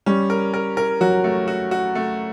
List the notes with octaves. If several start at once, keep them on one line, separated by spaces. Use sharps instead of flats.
G3 C#4
A#4
A#4
A#4
F#3 F#4
A3
F#4
F#4
A3